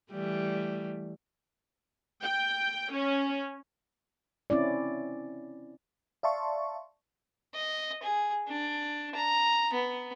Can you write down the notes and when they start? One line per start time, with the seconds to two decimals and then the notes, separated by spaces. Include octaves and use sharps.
0.12 E3 G3 A3
2.23 G5
2.92 C#4
4.50 C4 C#4 E4 D5
6.23 D5 E5 F5 A5 C6 C#6
7.54 D#5
8.03 G#4
8.48 D4
9.15 A#5
9.73 B3